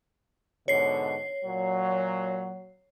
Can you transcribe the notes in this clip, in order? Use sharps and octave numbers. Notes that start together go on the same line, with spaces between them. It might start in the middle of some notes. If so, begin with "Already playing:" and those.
G#2 B2 D3 C#5 C7
A#2 F#3